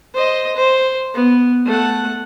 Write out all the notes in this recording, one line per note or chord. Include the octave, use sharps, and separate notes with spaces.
C5 D#5
C5
B3
A3 F#5